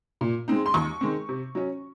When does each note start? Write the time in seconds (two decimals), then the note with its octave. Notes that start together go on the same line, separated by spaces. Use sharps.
0.21 A#2
0.48 G#3 C4 D#4
0.66 C6
0.74 D#2 C#6
1.01 D#3 G#3 C4
1.29 C3
1.55 F#3 C#4